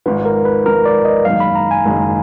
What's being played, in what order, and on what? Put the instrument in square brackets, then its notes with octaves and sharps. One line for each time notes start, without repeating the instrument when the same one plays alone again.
[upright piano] G#1 G#2 F3 [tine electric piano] B4
[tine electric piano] A#4
B4
[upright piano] G#1 G#2 F3 [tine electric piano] A#4
[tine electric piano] D5
D#5
[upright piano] F#1 F#2 D#3 G#3 [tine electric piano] F5
[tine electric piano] B5
A#5
G#5
[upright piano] F#1 F#2 D#3 G#3